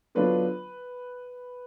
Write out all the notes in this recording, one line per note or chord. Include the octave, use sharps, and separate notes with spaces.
D3 F#3 B3 D4 F4 B4